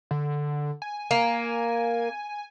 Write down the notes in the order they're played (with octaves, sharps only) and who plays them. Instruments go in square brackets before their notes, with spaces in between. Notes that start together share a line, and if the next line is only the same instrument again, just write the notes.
[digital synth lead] D3
G#5
[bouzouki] A#3